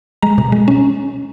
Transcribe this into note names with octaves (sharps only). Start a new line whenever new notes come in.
G#3 A#5
B2
G#3
C#4